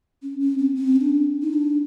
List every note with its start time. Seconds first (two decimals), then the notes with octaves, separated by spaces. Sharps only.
0.23 C#4
0.40 C#4
0.58 C4
0.75 C4
0.96 C#4
1.01 D4
1.42 D#4
1.53 D4